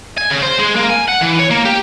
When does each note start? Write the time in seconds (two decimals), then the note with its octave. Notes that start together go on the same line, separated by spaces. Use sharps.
0.18 G#5
0.31 C#3
0.43 C5
0.59 G#3
0.76 A#3
0.90 G#5
1.09 F#5
1.22 E3
1.40 C#5
1.51 A#3
1.65 G4